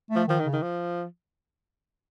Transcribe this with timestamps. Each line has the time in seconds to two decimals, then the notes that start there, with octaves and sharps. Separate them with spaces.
0.10 A3
0.16 F3
0.27 D#3 F3
0.40 D#3
0.45 C#3
0.53 D#3
0.63 F3